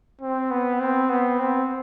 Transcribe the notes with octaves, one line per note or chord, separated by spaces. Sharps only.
C4
B3
C4
B3
C4